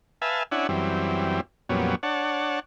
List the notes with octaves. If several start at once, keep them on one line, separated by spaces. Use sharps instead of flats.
B4 E5 F5 G#5 A5
C#4 D4 E4 F#5 G#5
F#2 E3 G3 C4
F2 A#2 F#3 G3 B3 C#4
D4 C#5 F#5 A5